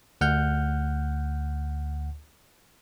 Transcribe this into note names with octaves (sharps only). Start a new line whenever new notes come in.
D2 F#5 F6 G6